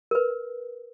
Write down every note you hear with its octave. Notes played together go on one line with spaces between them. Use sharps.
A#4 B4